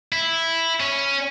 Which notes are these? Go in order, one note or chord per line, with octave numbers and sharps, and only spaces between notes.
E4
C#4